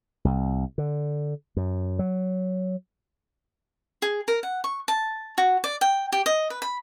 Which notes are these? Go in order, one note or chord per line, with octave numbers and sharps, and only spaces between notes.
C2
D3
F#2
F#3
G#4
A#4
F#5
C#6
A5
F#4
D5
G5
G4
D#5
B4
B5